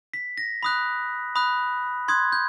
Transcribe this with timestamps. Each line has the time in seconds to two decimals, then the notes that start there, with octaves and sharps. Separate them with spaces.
0.13 B6
0.38 A#6
0.63 B5 D#6 F#6
1.35 B5 D#6 F#6
2.08 C6 D#6 F#6 G#6
2.32 G6